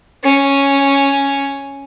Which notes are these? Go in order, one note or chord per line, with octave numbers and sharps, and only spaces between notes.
C#4